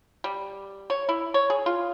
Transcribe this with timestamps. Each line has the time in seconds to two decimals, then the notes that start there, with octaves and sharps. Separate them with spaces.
0.24 G3
0.90 C#5
1.09 E4
1.34 C#5
1.50 G#4
1.66 F4